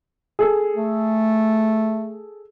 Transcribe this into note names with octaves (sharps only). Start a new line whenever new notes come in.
G#4 A4
A3